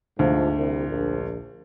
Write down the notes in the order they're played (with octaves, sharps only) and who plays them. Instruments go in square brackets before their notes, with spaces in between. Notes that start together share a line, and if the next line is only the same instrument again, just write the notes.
[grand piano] D2 [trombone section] G#2 F3
[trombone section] C2
A#1